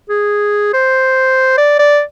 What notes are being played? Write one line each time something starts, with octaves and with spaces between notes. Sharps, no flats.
G#4
C5
D5
D5